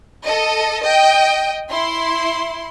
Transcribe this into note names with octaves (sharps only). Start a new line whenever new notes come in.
A4 D#5
D#5 G5
E4 C6